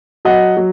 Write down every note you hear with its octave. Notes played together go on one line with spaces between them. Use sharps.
F#3 D#5 F#5
F#3